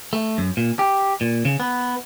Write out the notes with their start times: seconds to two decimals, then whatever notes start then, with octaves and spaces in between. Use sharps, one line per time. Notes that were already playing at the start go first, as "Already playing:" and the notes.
0.13 A3
0.38 F#2
0.57 A#2
0.79 G4
1.21 A#2
1.45 C#3
1.60 B3